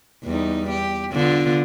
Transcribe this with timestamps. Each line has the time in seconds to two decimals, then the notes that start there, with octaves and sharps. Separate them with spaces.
0.24 E2 G3 D#4
0.70 G4
1.13 D3 B3 F4